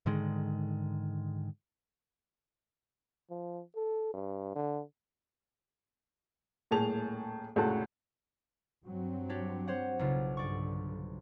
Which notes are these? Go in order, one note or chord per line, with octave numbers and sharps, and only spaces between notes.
G#2 D3 D#3 G#3
F3
A4
G2
D3
D#1 A2 A#3 G#4 A5 F7
F1 C#2 A2 G#3 F#4 A5
G2 F#3 C4
D4 G4 C#5
C5 C#5 F#5
B1 C#3 F4
G2 D3 D5 C#6